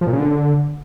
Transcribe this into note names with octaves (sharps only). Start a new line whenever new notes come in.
F3
A#2
C#3
D3